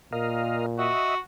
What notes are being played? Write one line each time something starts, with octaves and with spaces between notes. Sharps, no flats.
A#2 A#4 D#5 F5
F#4 D#5 E5